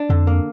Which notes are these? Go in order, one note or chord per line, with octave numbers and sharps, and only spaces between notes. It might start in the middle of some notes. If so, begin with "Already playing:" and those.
Already playing: D4
F2 D3
A#3